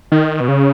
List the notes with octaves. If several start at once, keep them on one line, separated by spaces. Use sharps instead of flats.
D#3
B2
C#3